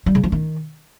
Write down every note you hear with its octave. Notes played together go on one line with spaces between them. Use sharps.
G3
C#3
F3
D#3